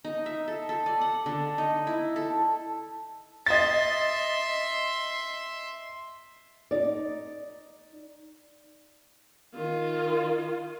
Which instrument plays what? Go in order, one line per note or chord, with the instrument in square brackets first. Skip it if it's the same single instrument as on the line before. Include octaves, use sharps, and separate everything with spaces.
[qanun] D#4
E5
A4
A4
D5
F#5
D3
D#4
E4
A4
[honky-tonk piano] D#5 A6 [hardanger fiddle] E5 C6
[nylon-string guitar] D#4 D5
[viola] D#3 F4